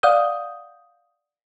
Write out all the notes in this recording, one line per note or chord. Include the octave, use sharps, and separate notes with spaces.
D5 F5 F#5 D#6 G6